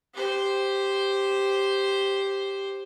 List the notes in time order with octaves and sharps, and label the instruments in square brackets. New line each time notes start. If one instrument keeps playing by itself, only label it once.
[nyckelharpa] G4 C5